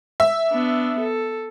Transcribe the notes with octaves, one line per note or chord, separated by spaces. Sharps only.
E5
B3 D4
A4